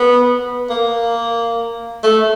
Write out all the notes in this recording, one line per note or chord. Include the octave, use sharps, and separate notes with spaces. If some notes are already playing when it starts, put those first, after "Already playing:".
Already playing: B3
A#3
A3